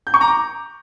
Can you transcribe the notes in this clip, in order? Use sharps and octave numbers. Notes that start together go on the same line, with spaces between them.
G6
C#6
A#5
D6